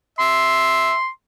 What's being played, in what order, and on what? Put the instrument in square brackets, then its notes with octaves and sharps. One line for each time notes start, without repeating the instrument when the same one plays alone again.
[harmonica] E5 [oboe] C6